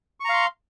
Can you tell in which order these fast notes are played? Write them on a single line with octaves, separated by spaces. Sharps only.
C#6 A#5 F5 C6